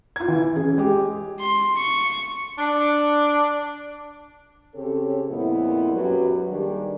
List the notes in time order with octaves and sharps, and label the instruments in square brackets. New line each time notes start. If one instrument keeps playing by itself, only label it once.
[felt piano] F4 G#6
E3
C#4 G#4
G#3 G4
[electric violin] C6
C#6
[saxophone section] D4
[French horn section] C#3 C4 G4 A4 C#5
F2 A#2 G#3 B3 E4
F#2 F#3 G4 B4
D#3 G3 A#3 D4 G4 G#4